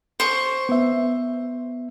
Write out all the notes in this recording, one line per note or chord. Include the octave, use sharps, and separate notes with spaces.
C5 C#6
B3 E5